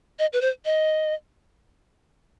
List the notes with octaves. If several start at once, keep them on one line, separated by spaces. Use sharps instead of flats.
D#5
B4
C5
D#5